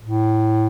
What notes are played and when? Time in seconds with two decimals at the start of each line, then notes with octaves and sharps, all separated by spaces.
0.03 A2